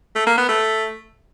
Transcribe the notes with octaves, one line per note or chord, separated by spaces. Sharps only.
A3
A#3
B3
A3